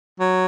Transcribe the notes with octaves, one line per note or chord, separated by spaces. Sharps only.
F#3